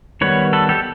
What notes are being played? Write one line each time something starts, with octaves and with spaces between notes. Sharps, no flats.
D#3 G3 B3 B4 C#5
A4 B4
G4 A4